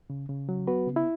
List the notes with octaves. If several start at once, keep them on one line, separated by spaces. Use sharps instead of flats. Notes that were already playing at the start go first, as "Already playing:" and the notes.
C#3
C#3
F#3
B3 F#4 B4
C#3
E4